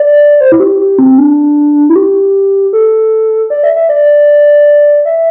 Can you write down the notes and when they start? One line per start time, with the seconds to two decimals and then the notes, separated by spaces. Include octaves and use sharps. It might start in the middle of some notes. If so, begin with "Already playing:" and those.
Already playing: D5
0.40 C5
0.52 E4
0.60 G4
0.79 G4
0.98 C4
1.18 D4
1.89 E4
1.96 G4
2.73 A4
3.50 D5
3.63 E5
3.76 E5
3.89 D5
5.05 E5